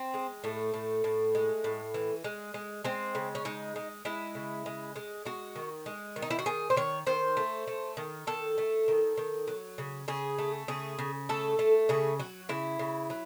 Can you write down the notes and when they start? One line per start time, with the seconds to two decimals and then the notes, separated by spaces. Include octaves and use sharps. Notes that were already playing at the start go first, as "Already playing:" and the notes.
Already playing: C4
0.14 G#3
0.44 A2 A3
0.74 A2
1.04 A2
1.35 G#3
1.64 A2
1.94 E3
2.24 G#3
2.54 G#3
2.84 G#3 C4
3.15 C#3
3.35 C#4
3.45 G#3 D#4
3.76 G#3
4.05 G#3 E4
4.35 C#3
4.66 G#3
4.96 G#3
5.25 G#3 F#4
5.56 D#3
5.86 G#3
6.16 D#3
6.22 D#4
6.30 E4
6.39 F#4
6.46 D#3 G#4
6.70 C5
6.76 D#3 C#5
7.07 D#3 C5
7.37 A3
7.67 A3
7.97 D#3
8.27 D#3 A4
8.58 A3
8.88 D#3
9.18 D#3
9.48 F#3
9.78 C#3
10.08 C#3 G#4
10.38 A3
10.68 C#3 G#4
10.99 C#3
11.29 A3 A4
11.59 A3
11.89 C#3 G#4
12.19 F#3 F#4
12.49 C#3 E4
12.79 C#3
13.10 F#3